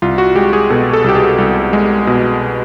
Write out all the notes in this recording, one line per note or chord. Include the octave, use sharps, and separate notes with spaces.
C2 F4
F#4
G#3 G4
G#4
B2 A4
A4
C2 G4
G#4
C2
G#3
B2